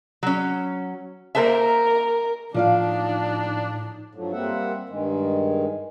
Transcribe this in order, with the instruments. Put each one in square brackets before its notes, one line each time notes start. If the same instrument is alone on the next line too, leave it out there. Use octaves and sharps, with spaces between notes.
[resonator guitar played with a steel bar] F#3 C#4
[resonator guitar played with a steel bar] A#3 C5 E5 [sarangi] A#4
[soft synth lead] A2 [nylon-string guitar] F3 D5 F5 [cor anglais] D4 [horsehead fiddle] D#4
[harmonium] G2 F3 F#3 A3
G3 A#3 C4 E5 F#5
G2 D#3 G#3